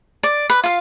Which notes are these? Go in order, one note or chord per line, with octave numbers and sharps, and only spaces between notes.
D5
B4
F4 F5